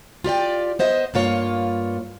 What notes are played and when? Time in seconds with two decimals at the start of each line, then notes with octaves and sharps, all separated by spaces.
0.24 F4 G4 D5 G5
0.79 B3 C5 D#5 E5
1.14 G2 A#3 F4 C#5